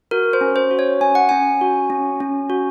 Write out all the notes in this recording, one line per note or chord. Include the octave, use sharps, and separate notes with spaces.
F#4 A#4
C5
C#4
C5
F#4
C#5
C#4 G#5
F#5
C#4 G#5
F#4
C#4
C#4
F#4